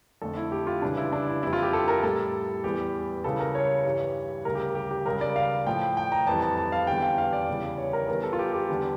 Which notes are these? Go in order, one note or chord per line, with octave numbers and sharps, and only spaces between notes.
F2 D3 A3 A4
E4
G4
F4
C#2 C#3 E3 G3 D4
E4
D4
E4
F2 E3 G3 E4
F4
G4
A4
A#4
A2 G3 A4
E2 E3 G3 G4
C#2 C#3 E3 G3 A4
A#4
C#5
G2 E3 G3
D2 C#3 G3 A#4
G4
G4
G4
C#2 C#3 G3 A#4
D5
F5
A2 F3 A3 G5
G5
A#5
F2 E3 G3 A5
A5
A5
F5
E2 D3 G3 G5
F5
F5
D5
E2 C#3 E3 G3
C#5
A#4
E2 E3 G3 A#4
A4
F4
G4
G4
E2 D3 G3